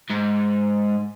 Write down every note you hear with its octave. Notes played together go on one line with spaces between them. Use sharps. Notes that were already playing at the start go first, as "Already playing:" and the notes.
G#2